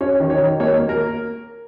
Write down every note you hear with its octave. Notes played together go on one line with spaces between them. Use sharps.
C#4 C#5
D#3
C#5
D#3
A#3 C#5
A#3
A#4